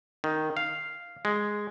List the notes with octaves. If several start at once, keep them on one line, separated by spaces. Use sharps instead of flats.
D#3
F5
G#3